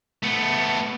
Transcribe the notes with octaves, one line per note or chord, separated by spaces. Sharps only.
A3 B3